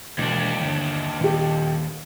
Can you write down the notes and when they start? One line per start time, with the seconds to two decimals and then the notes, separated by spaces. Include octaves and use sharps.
0.18 E1 D#2 D4
0.60 G1
1.20 D#1 G4